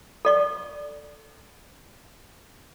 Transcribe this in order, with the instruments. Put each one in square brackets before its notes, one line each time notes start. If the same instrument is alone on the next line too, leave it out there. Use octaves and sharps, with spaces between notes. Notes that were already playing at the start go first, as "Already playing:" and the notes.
[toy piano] A4 D5 C#6